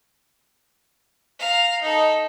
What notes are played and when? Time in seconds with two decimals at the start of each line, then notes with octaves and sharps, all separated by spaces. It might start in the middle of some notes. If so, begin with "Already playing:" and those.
1.40 F5 A#5
1.82 D#4 A4